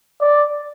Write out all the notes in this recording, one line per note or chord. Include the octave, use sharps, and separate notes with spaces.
D5